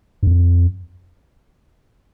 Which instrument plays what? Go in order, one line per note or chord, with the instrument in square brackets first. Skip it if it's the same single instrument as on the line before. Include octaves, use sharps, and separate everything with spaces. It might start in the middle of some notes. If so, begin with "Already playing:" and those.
[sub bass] G2
F2